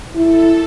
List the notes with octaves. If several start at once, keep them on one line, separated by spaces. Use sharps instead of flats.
E4 A4